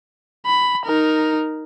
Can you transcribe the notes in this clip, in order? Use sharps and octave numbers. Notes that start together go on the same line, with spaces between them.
B5
D#4 A#4